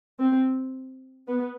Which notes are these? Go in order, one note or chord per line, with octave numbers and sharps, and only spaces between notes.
C4
B3